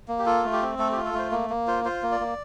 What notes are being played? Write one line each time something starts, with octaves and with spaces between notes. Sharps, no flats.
A#3
G4
F4 A4
A3
G4
C4
A3 A4
G4
F4
A4
A3 C5
A#3
A#3
F4 C5
F4 C5
A#3
D5
A#3